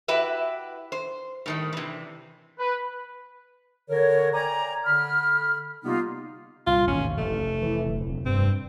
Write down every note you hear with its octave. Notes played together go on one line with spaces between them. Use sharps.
E4 F#4 G4 B4 E5
C5
A2 D#3 G3
C3 E3
B4
D3 A#4 C#5
D5 G5 G#5 A#5
D3 B5 F6
C3 G3 A#3 B3 D#4 F4
C2 A#2 F4
A1 D#2 G#2 B2 C#4
F1 A3
E3
D1
G2 C4